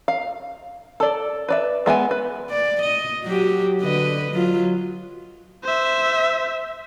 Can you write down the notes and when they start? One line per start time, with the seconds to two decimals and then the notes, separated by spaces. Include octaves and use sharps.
0.08 F5
1.00 A4 D5
1.49 B4 D5 E5
1.86 G#3 B3 E5 G#5
2.11 B4
2.50 D5
2.82 D#5
3.24 F#3 F#4 G4
3.81 D3 B4 D#5
4.31 F#3 F4
5.63 C5 E5